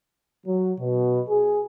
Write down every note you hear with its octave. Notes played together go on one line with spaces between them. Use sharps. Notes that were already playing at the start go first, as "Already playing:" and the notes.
F#3
B2
G#4